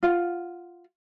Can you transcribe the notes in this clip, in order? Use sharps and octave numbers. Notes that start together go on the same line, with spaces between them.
F4 F#5